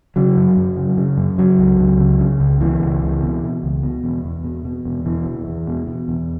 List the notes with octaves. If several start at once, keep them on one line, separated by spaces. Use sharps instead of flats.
C#3 F#3
F#2
F#2
C#3
C#3
F#2
C#3 F#3
C#2
C#2
C#3
C#3
C#2
B2 E3
C#2
C#2
B2
B2
C#2
B2
E2
E2
B2
B2
E2
B2 E3
E2
E2
B2
B2
E2